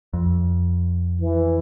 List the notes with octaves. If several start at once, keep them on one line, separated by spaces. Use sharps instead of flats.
F2
E3